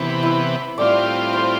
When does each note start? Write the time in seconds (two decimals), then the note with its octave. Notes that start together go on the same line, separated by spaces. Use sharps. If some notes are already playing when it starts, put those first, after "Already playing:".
Already playing: C3 E3 B3
0.23 E4
0.78 A2 G3 C4 F4 D5
1.33 C5